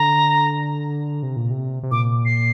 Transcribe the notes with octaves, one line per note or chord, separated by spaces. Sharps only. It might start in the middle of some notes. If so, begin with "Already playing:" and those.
Already playing: D3 A#5
C3
A#2
C3
C3
A#2 D6
C7